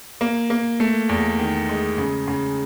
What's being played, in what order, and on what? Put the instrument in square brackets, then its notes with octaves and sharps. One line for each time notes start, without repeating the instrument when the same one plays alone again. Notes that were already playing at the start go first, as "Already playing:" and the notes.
[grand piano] A#3
A#3
A3
E2
D#3
G#3
C#3
C#3